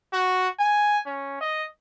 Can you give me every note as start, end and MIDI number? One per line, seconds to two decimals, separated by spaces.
0.13 0.48 66
0.59 1.00 80
1.06 1.39 61
1.41 1.65 75